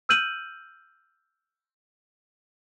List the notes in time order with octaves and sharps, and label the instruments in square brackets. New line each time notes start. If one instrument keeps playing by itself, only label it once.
[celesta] E6 F6 G6 D#7 F#7